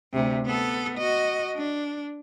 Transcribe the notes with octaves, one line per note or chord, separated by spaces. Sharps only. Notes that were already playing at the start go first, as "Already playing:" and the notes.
D2 C3
B3 A4
F#4 D#5
D4